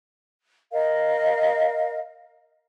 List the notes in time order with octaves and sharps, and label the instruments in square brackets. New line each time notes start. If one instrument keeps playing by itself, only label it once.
[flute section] A#4 D#5 F5